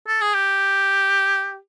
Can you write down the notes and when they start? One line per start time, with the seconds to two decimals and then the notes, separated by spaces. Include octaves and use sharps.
0.08 A4
0.21 G#4
0.34 G4